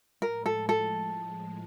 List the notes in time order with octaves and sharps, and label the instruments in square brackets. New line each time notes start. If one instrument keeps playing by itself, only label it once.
[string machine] A2 F3 G#3 [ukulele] A#4
[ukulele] A4
A4